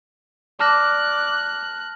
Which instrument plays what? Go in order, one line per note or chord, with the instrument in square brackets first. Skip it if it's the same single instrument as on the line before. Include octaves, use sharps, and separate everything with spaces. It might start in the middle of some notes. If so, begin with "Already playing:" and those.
[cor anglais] D5 [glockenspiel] A5 F6 A#6 [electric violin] F#6